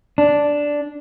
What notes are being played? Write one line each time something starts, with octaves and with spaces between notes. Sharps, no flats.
D4